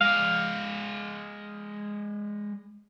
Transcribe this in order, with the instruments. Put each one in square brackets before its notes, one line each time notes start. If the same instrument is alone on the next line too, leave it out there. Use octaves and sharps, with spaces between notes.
[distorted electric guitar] G#3 D5 [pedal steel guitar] F5